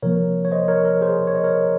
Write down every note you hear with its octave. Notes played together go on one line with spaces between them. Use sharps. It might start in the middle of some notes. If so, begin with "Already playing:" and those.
C3 F3 A#3 A#4 C#5
C#5
C5 D#5
A#4 C#5
A#4
G#4 C5
C#5
D#5
A#4 C#5